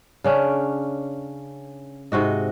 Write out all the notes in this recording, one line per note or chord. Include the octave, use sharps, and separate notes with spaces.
C#3 C#4 D4
G#2 C3 F#4 D#5